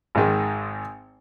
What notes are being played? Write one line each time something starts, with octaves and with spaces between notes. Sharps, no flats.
G#1 G#2 D#3 G#3